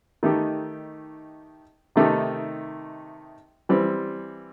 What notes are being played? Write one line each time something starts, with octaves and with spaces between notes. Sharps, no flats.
D#3 A3 D#4 G4
C3 D#3 A3 D#4 G4
E3 G3 C4 E4